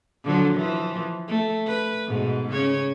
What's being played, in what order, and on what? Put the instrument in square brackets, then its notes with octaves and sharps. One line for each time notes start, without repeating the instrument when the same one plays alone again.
[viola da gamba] D3 F3 F#3
E3 F3
A3
B4
G#2 B2
C#3 C#5